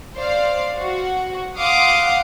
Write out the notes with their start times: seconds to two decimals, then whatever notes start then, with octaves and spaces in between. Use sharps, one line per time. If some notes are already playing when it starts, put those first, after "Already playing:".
0.16 C5 D5 F5
0.77 F#4
1.59 F5 F#5 C6 D6 D#6